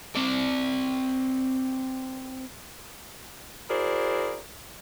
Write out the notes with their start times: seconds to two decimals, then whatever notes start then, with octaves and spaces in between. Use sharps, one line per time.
0.16 C4 D5
3.69 E4 F#4 G#4 A#4 C5 D5